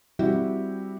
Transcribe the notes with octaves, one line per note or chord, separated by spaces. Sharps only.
G3 C4 E4 F#4 G4